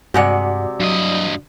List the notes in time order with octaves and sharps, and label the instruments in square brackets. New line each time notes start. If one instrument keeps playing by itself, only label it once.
[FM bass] G2 [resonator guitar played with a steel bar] C3 G#3 F#5 [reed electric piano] F#4 D5
[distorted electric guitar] G2 D#5 [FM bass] F#3